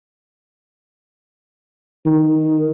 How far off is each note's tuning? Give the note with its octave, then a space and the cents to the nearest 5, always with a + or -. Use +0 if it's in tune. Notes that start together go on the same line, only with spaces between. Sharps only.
D#3 +0